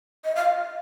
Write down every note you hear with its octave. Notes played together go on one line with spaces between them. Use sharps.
D#5
F5